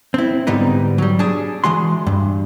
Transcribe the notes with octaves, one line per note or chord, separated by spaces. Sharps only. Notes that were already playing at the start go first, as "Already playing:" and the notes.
C4 E4
G#2 D3 G3 B3 D#4
F#3 G3
D4 G#4
E3 G#3 F#4 C6
G2